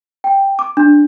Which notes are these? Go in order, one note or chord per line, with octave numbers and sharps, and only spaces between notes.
G5
D6
D4